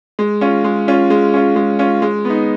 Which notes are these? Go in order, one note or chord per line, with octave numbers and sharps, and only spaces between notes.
G#3
C#4 F4
G#3
C#4 F4
G#3
C#4 F4
G#3
C#4 F4
G#3
B3
D#4